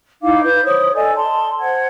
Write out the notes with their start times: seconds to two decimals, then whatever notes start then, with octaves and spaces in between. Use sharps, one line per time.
0.22 D#4 E4 F5 D6
0.41 B4 G6
0.63 C5 C#5 D#6
0.94 A4 D5 D#5 G#5
1.15 A5 C6
1.60 C5 F#5 G#6